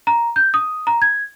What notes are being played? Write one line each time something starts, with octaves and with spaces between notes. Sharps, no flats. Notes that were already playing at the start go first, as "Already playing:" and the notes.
A#5
G6
D#6
A#5
G#6